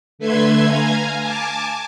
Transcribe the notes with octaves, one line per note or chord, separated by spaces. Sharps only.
D3 A3 B4 E5 C6 G#6
F5 G#5 A#5
G#5 A5 D6